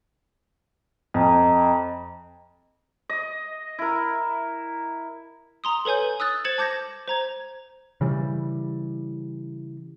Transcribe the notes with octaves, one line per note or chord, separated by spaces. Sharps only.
F2 D#5 A#5
D#5
E4 A#4
A#5 C6 D#6
A4 B4 C#5 G#5 G6
D#6 E6 F#6 A6
C5 G#6 A6 C#7 E7 F#7
A5 D6 G6 G#6 A#6
C5 A#5 G#6
C#3 E3 G3